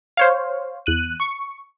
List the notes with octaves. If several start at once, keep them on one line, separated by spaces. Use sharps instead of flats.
C5 C#5 F5
E2 F#6 D#7
C#6